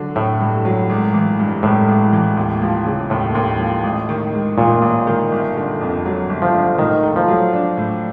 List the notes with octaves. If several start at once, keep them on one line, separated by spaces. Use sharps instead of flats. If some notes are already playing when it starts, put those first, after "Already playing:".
Already playing: D3 F#3
A2 A3
G2
F#3
G#1
E3
G2
G#1 A2
G#1
E3
D#2
F3
C#3
D#2 A2
D#2
F3
A1
D#3
G#2
A1 A#2
A1
D#3
G1
D3
F2
F#3
G1
F3
D3
A2 D#3
A3
F3
F#3
D4
A2